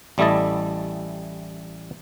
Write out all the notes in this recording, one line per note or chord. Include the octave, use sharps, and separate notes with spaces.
A1 G3 A3 E4 D#5 A5